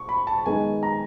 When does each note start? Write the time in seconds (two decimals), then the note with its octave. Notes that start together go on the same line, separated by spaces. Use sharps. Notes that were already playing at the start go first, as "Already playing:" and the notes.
Already playing: C#6
0.09 B5
0.27 A5
0.38 A5
0.46 D#3 G#3 B3 D#4 G#5
0.83 A#5